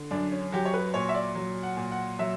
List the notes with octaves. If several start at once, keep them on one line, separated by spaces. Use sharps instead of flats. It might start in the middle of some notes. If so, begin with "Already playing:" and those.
Already playing: D3
F#2 D4
C#4
F#3 G4
C#5
B4
A#2 C#5
E5
D5
F#3
F#5
A#2
F#5
F#3 E5